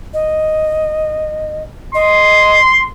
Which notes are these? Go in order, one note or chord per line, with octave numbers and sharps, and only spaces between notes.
D#5
D#5 C6